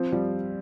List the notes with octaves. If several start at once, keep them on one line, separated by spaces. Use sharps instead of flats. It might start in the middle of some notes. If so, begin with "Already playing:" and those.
Already playing: F3 C4
F3 G3